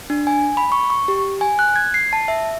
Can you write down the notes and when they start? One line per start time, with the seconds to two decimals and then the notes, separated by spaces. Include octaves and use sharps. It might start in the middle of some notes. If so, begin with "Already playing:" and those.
0.10 D4
0.27 G#5
0.57 B5
0.72 C#6
0.90 C#6
1.08 G4
1.41 G#5
1.59 F#6
1.76 G#6
1.94 C7
2.13 A5
2.28 E5